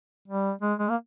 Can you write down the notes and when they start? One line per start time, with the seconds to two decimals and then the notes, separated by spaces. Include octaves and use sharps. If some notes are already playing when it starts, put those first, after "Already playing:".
0.28 G3
0.62 G#3
0.79 G#3
0.89 A#3